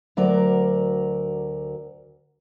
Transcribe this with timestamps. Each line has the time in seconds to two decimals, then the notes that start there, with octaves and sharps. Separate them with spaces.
0.17 D2 F#3 A#4 D5